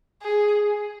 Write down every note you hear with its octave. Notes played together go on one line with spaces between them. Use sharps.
G#4